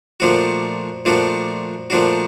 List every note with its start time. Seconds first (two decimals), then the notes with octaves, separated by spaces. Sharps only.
0.20 A#2 F3 A3 D4 F#4
1.05 A#2 F3 A3 D4 F#4
1.90 A#2 F3 A3 D4 F#4